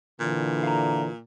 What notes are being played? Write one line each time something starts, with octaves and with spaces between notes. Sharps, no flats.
A#2 D3 E3
F5 A#5